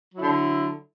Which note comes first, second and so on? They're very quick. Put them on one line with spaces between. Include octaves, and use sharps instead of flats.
F#3 E4 D3